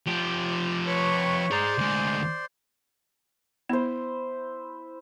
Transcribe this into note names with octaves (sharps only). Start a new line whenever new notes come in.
F3 G4
D6
B4 C#5 C#6
G#4 C5 D5 A#5 C6
D2 G#3
B3 E4 C5